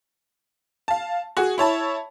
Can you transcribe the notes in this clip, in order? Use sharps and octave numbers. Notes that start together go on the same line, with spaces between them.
F5 A5
F#4 G#4
E4 C#5 A5 B5